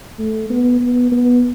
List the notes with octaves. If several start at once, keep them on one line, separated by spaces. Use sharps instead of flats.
A3
B3
B3
B3